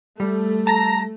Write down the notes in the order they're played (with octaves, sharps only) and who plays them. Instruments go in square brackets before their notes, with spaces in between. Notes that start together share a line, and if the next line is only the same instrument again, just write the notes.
[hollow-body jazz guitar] G3 [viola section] A3
[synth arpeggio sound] A5 A#6 [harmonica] A#5